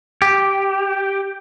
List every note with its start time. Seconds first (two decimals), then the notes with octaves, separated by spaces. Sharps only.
0.22 G4